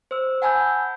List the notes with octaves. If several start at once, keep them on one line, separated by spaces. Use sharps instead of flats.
C5 E6
F#5 G#5 A5 B5 E6 G6